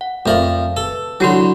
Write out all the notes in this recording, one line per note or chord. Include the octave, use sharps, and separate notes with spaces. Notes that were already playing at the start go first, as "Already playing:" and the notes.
F#5
F2 A3 A#4 E5 F5
A4 B4
D3 F#3 E4 F#4 C6